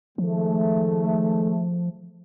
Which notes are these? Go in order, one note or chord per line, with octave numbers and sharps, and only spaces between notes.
D#3 F3 G#3 A3